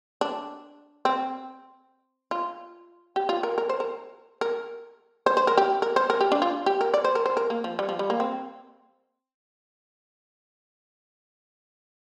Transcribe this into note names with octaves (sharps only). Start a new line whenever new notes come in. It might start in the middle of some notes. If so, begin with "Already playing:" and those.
D4
C4
F4
G4
F4
A#4
A#4
C5
A#4
A#4
C5
C5
A#4
G4
A#4
C5
A#4
G4
D4
F4
G4
A#4
D5
C5
A#4
C5
A#4
A#3
F3
G3
F3
G3
A#3
C4